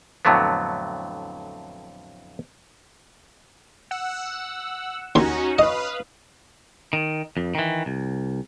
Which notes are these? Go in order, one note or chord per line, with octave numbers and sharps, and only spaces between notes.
F2 A2 D3 F#3 A3 B3
F#5 E6
D#2 C#4 D#4 F#4 C6
B4 D#5 F5 D#6
D#3
F2
D#3 E3
C2